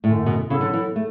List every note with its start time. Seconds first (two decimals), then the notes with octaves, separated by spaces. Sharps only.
0.03 F#2 A2 D3 A3
0.26 B2
0.49 C#3 F#3 B3 E4 A4
0.61 D3
0.74 E3
0.96 A3